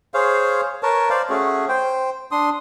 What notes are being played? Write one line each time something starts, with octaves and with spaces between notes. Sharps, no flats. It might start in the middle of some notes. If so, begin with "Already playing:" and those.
G#4 C5 C#5 F5
A#4 B4 C#5 A5
C5 D5 F5
A3 C#4 F#4 G#4
C5 G5
D4 C6 D#6